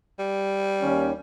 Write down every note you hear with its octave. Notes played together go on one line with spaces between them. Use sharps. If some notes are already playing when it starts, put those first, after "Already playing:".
G3
D#2 C#4